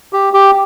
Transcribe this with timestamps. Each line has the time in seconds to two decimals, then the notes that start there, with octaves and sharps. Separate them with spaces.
0.13 G4
0.33 G4